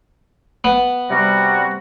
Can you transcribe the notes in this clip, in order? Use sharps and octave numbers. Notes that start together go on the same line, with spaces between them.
B3
C3 G3 F#4